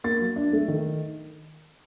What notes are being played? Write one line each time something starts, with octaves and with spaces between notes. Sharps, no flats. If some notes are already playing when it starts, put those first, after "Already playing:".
A#3 A6
F#3
D4
A3
D#3